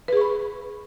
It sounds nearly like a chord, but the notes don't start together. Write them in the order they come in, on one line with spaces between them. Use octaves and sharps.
B4 G#4 C#6 B5